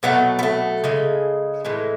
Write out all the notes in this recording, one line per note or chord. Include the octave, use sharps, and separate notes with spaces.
B2 F#3 A3 B3
B3
A3
C#3 G#3
A2 E3 G#3